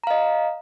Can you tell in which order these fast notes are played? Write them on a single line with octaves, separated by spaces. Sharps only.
A#5 F5 D#5